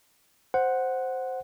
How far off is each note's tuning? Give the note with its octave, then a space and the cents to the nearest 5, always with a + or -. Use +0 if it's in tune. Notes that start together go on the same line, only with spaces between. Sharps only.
C5 +0 F#5 +0